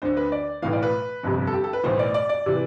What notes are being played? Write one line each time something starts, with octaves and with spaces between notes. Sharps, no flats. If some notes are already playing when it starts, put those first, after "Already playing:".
D2 D3 C5
B4
D5
B1 A2 E3 F5
D5
B4
G1 F2 C3
A4
G4
A4
B4
B1 A2 E3 C5
D5
D5
D5
C3 E3